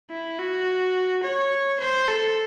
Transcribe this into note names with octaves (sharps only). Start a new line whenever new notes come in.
E4
F#4
C#5
C5
A4